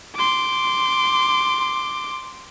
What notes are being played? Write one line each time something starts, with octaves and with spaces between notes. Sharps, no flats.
C6 D6